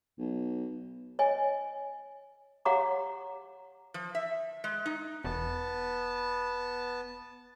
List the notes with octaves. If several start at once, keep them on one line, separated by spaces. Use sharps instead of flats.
B1
C#5 D#5 G#5
G4 C#5 F5 F#5 A#5 D6
F3
E5
G#3
D#4
E1 B3 A5